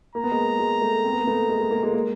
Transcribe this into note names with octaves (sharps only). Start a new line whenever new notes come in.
A#3 A#5
B3
G#3 A#3
G#3
A3
C4
B3
A#3
A3 B3
G#3 A#3
G#3
G#3 A#3
G#3 A#3
G#3 A#3